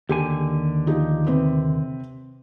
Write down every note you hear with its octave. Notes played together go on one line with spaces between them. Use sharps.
D#2 D3 G4 G#5
F3 D#4 G4
C3 C4 B4